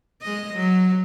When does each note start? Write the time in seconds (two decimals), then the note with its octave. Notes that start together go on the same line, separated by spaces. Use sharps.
0.22 G#3 D#5
0.54 F#3